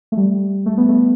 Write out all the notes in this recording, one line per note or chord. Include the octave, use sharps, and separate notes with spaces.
A3
G3
A3
B3
A3